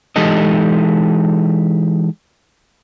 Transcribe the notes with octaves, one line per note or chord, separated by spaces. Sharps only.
E3 G#3 D#4 G4 A4 D#5